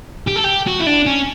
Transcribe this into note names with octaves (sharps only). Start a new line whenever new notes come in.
G4
A4
G4
F#4
E4
D4
C#4